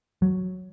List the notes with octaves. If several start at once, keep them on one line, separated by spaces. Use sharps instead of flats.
F#3